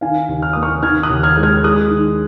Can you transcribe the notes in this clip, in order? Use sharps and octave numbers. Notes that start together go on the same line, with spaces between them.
D#3 F5 G#5
D#2
F6
A#3 D#6
C#6 F6
D#3 F6 G#6
D#6 F#6
D#2
F6 G#6
G#3
F6 G#6
G#3 D#6 F#6
D#3